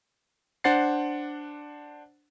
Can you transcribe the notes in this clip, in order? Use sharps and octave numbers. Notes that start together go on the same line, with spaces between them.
D4 C5 F#5 A6 C7